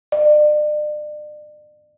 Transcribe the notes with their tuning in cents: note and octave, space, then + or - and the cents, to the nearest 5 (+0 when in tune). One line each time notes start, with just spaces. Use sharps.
D5 +35